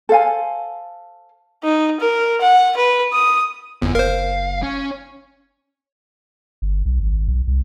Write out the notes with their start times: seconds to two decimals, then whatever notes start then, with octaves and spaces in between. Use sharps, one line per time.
0.09 A4 C5 F5 G#5
1.64 D#4
2.00 A#4
2.42 F#5
2.77 B4
3.13 D#6
3.82 G1 F2 B3 E4
3.95 F#1 A#4 C5 F5
4.63 C#4
6.62 G1
6.85 B1
7.00 G#1
7.28 B1
7.48 C2